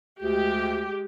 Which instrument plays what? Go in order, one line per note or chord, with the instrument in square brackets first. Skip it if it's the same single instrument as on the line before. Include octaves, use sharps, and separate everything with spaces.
[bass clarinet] D2 [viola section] G#3 G4